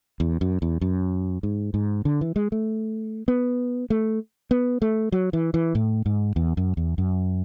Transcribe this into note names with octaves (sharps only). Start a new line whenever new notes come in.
E2
F#2
E2
F#2
G#2
G#2
D3
E3
G#3
A3
B3
A3
B3
A3
F#3
E3
E3
A2
G#2
E2
F#2
E2
F#2